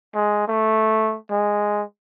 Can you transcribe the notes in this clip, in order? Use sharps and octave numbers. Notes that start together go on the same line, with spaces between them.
G#3
A3
G#3